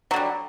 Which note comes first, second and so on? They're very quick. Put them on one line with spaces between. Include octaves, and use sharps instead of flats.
F#3 D3 G3